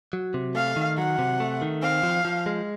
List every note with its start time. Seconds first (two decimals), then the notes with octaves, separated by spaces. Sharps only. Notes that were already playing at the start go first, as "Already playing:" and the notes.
0.13 F#3
0.34 C3
0.55 A3 F5
0.76 D#3
0.98 F#3 F#5
1.19 C3
1.40 A3
1.62 D#3
1.83 C4 F5
2.03 F3
2.25 F3
2.46 G#3